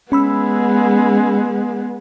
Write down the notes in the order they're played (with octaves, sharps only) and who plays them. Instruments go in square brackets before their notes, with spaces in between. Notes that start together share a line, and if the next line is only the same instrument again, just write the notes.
[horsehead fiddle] G#3 B3 [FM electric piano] C#4 B5 E6